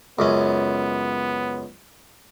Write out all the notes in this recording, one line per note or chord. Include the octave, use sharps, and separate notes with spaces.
C#2 F#2 B3 C#4